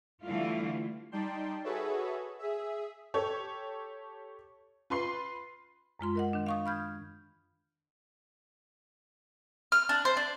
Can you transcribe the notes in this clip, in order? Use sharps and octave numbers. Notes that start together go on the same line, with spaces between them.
D3 E3 G3 A3 E4 F4
G3 D#4 D5 G5 A5 C6
F#4 G#4 A4 B4 C#5 E5
G#4 E5
G4 A4 C#5
F4 B4 C6 C7
F#2 G#3 F4 C6
A#4 D#5 F#5
D#3 D4
F5 C#6 D#6
B5 F6 G6 G#6
F6
D4
C5
D4